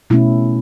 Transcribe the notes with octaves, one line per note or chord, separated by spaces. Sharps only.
B2 A3 C#4 E4